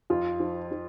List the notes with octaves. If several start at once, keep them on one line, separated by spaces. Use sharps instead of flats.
F2 F4
F3
F3